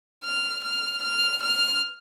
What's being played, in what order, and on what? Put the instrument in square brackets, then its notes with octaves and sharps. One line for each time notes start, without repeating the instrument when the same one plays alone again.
[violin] F6
F6
F6
F6